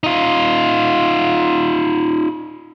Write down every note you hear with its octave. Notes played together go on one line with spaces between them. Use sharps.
D#4 F4